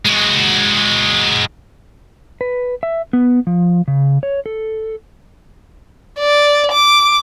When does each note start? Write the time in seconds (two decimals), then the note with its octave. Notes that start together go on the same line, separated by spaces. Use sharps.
0.05 G#3 F#4
2.41 B4
2.83 E5
3.13 B3
3.47 F3
3.88 C#3
4.23 C#5
4.46 A4
6.19 D5
6.72 D6